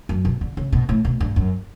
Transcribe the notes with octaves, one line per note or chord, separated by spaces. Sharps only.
F#2
B2
D3
C#3
B2
A2
B2
G2
F#2